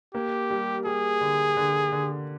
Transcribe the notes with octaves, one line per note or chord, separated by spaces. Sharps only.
A#3 G4
G3
G3 G#4
D3
D3
D3